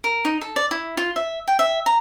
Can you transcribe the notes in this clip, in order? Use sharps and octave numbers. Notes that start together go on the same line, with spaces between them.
A#4
D#4
A4
D5
E4
F4
E5
G5
E5
A#5